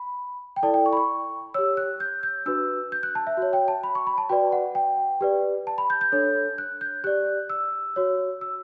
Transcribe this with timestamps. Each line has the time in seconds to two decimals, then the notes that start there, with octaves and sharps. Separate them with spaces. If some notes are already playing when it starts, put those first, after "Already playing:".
Already playing: B5
0.56 G5
0.63 E4 A4 D5 A5
0.74 G5
0.86 C#6
0.93 B5
0.97 C#6
1.54 G4 C#5 E6
1.77 F#6
2.00 G6
2.23 G6
2.46 D4 F#4 B4 E6
2.92 G6
3.03 F#6
3.15 A5
3.27 E5
3.37 F#4 C#5
3.53 G5
3.68 A5
3.83 B5
3.95 C#6
4.07 B5
4.18 A5
4.29 F#4 B4 D5 G5
4.52 F#5
4.75 G5
5.21 G4 B4 D5
5.67 A5
5.78 B5
5.90 G6
6.01 G6
6.12 D4 A4 C#5
6.58 F#6
6.81 G6
7.04 G4 D5 F#6
7.50 E6
7.96 F#4 C#5
8.41 E6